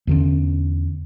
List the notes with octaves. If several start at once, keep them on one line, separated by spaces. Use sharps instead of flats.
E2 D3 C#4